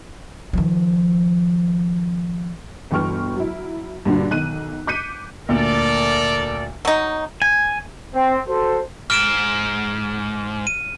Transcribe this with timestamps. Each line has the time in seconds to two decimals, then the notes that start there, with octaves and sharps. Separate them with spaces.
0.53 D#3 F3
2.91 G1 B2 E3 G5 C#6 F6
3.36 F#3 E4
4.05 G2 A#2 D3 F#4
4.31 B1 D#3 F#6 D#7
4.87 D6 F#6 G6 B6 C#7 D#7
5.49 D2 A#2 A4 A#4 D5
6.85 F#3 D#4
7.42 G#5
8.13 C4
8.47 F#4 A4 C5
9.10 G#2 F6 D7 E7
10.67 D#7